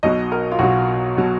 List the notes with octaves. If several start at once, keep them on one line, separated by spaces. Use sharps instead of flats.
B1 B2 F#3 D#5
A#4
F4
B1 B2 F#3 F#4
B2 F#3